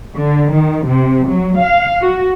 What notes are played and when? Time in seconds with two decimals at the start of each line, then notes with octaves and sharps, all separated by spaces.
0.16 D3
0.51 D#3
0.85 C3
1.28 F#3
1.57 F5
2.01 F#4